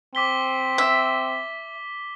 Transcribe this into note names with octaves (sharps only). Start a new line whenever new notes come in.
C4 D6 B6 G7
E5